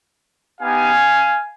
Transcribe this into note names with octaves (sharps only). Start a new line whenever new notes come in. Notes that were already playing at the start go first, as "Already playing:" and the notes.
B3 D#4 G4 F5 G#5